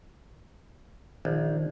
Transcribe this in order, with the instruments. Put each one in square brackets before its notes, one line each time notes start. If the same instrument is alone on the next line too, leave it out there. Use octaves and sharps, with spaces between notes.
[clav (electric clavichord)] A#1 [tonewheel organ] D#3